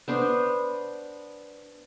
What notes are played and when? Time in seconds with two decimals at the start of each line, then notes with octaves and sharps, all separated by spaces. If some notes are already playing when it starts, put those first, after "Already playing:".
0.08 B3 D4 C5